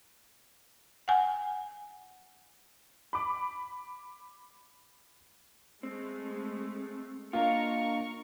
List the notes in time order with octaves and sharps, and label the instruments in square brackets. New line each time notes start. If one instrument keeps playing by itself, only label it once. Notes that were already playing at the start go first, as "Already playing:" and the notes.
[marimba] F#5 G#5
[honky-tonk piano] B5 D6
[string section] G#3 A3 [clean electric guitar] C4
[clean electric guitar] A#3 D4 D#5 [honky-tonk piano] F4 [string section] A#4 C#6